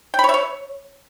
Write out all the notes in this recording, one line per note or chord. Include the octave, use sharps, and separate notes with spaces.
G5
B5
C#5
E5
C#5